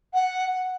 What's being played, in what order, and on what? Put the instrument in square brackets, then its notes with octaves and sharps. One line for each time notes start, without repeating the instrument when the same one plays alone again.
[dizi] F#5